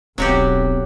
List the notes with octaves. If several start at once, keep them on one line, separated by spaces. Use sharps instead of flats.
D1 B1 F#3 B3 C4 F#4 G4